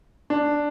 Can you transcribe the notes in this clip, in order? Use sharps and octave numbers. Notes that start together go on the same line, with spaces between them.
D4